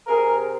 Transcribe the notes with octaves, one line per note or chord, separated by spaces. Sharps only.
C3 G#4 A#4